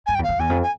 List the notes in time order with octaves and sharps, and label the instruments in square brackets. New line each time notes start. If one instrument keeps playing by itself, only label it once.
[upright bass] G2 [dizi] G#5
[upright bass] E2 [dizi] G5
[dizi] F5
[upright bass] F2
[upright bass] E2 [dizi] G#5
[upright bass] F2
[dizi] G#5